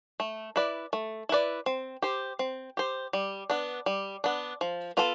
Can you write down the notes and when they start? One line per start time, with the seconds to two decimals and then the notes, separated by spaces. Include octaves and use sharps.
0.20 A3
0.56 E4 B4 D5
0.93 A3
1.29 E4 B4 D5
1.66 C4
2.02 G4 C5
2.39 C4
2.77 G4 C5
3.13 G3
3.50 B3 D4
3.86 G3
4.24 B3 D4
4.61 F3
4.97 B3 F4 A4